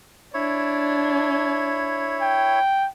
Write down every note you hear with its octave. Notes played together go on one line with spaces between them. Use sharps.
D4 E4 C#5
G5